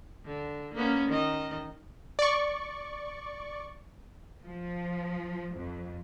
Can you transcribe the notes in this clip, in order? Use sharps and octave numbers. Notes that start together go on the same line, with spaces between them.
D3
A#3 B3 C#4
D#3 D#5
D5 C#6
F3
F2